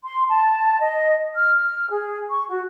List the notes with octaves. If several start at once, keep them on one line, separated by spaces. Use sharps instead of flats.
C6
A5
D#5
F6
F6
G#4
C#6
F#4